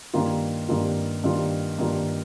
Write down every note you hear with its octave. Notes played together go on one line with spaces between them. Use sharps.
G2 D#3 A#3 F4
G2 D#3 A#3 F4
G2 D#3 A#3 F4
G2 D#3 A#3 F4